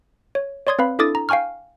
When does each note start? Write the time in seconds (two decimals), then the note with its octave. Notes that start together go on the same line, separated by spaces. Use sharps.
0.35 C#5
0.67 C#5 D5 C6 D#6 G#6
0.79 C4 B4 F5 B5
0.99 D4 E4 A4 D6 D#6 A6
1.15 A#5
1.29 F5 G5 G#5 C#6 F6